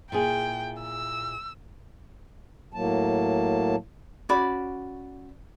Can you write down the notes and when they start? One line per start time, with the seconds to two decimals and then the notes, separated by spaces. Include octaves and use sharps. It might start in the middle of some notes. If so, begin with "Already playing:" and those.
0.12 A#2 E4 G#4 G5
0.82 E6
2.73 A2 F#3 A#3 A5
4.29 C#4 F#4 D5 B5